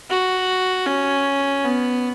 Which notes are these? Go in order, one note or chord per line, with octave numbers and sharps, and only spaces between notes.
F#4
C#4
B3